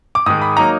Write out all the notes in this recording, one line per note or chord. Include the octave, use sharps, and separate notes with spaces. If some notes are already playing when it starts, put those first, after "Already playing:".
D6
G#2 D#3 G#3 D#6
B5
F#3 A#3 D#4 A#5